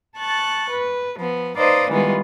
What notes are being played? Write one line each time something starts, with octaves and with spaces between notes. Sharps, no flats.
A5 C#6 F#6 A6
B4
F3 B3
D#4 B4 C5 D5 D#5 F5
D#3 E3 G3 G#3 B3 F4